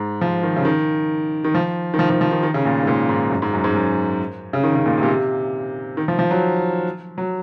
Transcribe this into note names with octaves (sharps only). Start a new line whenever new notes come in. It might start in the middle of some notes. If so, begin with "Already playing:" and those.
Already playing: G#2
F3
D#3
C#3
D#3
D#3
F3
D#3
F3
F3
F3
D#3
D#3
C#3
A#2
G#2
A#2
G#2
F#2
G#2
F#2
G#2
F#2
C#3
D#3
C#3
A#2
C3
A#2
C3
D#3
F3
F3
F#3
F#3